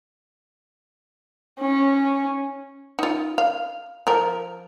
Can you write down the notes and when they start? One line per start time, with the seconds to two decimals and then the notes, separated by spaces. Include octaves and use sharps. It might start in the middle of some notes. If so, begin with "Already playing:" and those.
1.59 C#4
2.99 D#4 F4
3.38 F5
4.07 F3 A#4